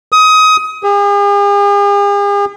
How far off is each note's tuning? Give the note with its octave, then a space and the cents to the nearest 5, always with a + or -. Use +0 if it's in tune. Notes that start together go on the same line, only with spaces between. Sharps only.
D#6 +25
G#4 -45